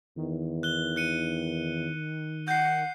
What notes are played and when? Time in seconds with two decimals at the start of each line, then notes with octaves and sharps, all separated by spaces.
0.17 E2 D#3
0.63 F#6 G7
0.96 F#6 C#7 D#7
2.48 F#5 G6 C7